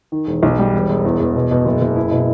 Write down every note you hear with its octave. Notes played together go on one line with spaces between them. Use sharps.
D#3
E1
B1
G3
E1
E1
E2
E2
B2
B2
F#1
F#1
E4
B2